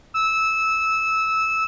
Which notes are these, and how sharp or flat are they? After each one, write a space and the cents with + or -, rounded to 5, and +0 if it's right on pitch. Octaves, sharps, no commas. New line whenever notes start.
E6 -15